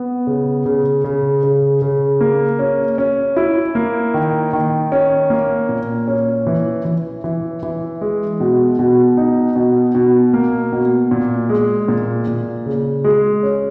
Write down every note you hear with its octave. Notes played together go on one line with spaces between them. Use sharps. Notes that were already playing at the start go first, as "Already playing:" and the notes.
Already playing: B3
C#3
C#3
C#3
C#3
C#3
A#3
C#4
C#4
E4
A#3
D#3
D#3
C#4
A#3
A#2
C#4
E3
E3
E3
E3
G#3
B2
B2
D#4
B2
B2
A#3
B2
A#2
G#3
A#2
A#2
C#3
G#3
C#4